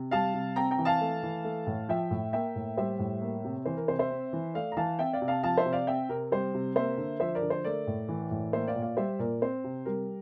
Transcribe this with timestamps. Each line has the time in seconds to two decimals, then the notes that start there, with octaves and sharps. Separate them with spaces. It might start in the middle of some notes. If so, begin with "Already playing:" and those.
Already playing: C3
0.11 G3 F5 A5
0.34 C3
0.56 C4 G5 A#5
0.71 G5 A#5
0.78 E3
0.85 F5 A5
1.01 A3
1.23 E3
1.44 A3
1.67 A2
1.89 F3 E5 G5
2.11 A2
2.33 A#3 E5 G5
2.55 A2
2.77 G3 C5 E5
2.99 A2
3.21 A#3
3.44 C3
3.65 E3 C5
3.77 A#4
3.88 C3 C5
3.99 C5 E5
4.10 C4
4.33 E3
4.54 A3 D5 F5
4.72 A#5
4.77 E3 F5 A5
4.99 C4 E5 G5
5.13 D5 F5
5.22 C3
5.28 F5 A5
5.43 F3 F5 A5
5.57 C5 E5
5.65 C3
5.72 D5 F5
5.87 C4 E5 G5
6.09 C3 A#4
6.32 G3 C5
6.54 C3
6.75 A#3 C5 E5
6.97 D3
7.20 F3 C5 E5
7.35 A#4 D5
7.42 D3
7.50 C5
7.64 A3 A#4 D5
7.87 A2
8.08 E3
8.31 A2
8.53 A#3 C5 E5
8.68 D5 F5
8.75 A#2
8.82 D5 F5
8.97 G3 C5 E5
9.19 A#2 A#4 D5
9.42 C4 C5
9.64 C3
9.85 G3 A#4